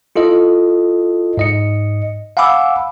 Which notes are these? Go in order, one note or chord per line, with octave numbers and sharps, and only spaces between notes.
E4 F4 A4 D#5
G#2 D#5 C#7
F5 F#5 G#5 B5 D6 E6